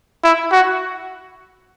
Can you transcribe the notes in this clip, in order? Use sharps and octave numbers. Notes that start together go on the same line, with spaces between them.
E4
F#4